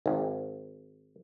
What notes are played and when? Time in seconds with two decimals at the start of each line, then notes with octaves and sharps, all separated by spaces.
0.06 G#1